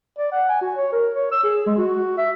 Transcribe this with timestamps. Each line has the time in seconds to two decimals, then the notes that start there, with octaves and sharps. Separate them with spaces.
0.18 D5
0.32 F#5
0.49 G#5
0.61 F#4
0.75 C#5
0.92 A#4
1.14 C#5
1.32 E6
1.43 G#4
1.66 G#3
1.78 F#4
2.17 E5